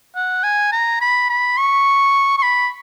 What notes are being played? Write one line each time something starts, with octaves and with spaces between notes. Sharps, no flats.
F#5
G#5
A#5
B5
B5
C#6
C#6
B5